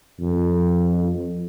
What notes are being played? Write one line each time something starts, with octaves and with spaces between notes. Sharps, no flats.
F2